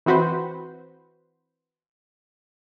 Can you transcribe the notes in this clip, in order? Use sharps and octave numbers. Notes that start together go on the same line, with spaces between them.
E3 C4 F#4 B4 C5